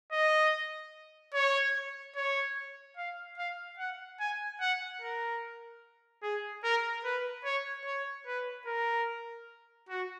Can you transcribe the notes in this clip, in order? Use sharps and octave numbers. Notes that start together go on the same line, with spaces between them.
D#5
C#5
C#5
F5
F5
F#5
G#5
F#5
A#4
G#4
A#4
B4
C#5
C#5
B4
A#4
F#4